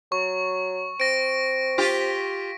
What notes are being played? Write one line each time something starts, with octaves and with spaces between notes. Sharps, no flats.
F#3 C#6
C4 A#6 D7
F4 G4 B6